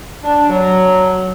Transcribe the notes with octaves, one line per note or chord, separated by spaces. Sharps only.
D4
F#3